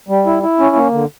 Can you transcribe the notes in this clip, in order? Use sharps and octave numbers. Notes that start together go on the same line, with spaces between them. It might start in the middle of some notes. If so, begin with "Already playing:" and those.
G3
E4
E4
C#4
A#3
D3